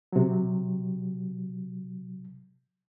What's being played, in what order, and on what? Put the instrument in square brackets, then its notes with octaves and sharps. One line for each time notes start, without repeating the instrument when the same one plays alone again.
[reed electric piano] C3 F#3